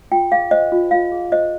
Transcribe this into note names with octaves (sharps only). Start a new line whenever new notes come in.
F4 G5
G#4 F5
C5 D#5
F4
F4 F5
G#4
C5 D#5